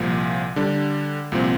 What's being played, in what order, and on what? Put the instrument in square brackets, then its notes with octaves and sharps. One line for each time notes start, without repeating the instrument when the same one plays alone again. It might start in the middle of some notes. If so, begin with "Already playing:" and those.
Already playing: [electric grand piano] C2 A#2 F3
D3 G3 D4
C2 A#2 F3 C4